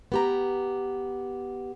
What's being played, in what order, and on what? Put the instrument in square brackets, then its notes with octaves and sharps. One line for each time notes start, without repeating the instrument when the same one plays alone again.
[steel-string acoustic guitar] B3 G4 A#5